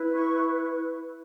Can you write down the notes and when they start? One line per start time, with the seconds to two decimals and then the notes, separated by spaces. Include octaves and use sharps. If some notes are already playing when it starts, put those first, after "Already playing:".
Already playing: E4 B4
0.13 C#6